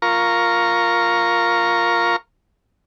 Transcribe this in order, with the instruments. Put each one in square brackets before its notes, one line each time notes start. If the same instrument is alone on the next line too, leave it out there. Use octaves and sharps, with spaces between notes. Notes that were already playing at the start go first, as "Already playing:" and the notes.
[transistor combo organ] F4 A#4 A#5 C#6